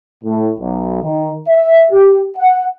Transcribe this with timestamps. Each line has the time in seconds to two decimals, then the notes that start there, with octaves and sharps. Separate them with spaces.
0.24 A2
0.59 B1
1.03 D#3
1.48 E5
1.91 G4
2.37 F#5